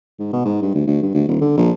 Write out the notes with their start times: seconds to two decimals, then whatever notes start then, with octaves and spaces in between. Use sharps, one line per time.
0.19 G#2
0.32 B2
0.45 G#2
0.62 G2
0.74 D2
0.87 D2
1.02 G2
1.14 D2
1.28 D#1
1.41 D3
1.57 A#1